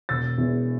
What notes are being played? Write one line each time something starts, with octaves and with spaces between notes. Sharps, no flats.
E1 E6 A6
E2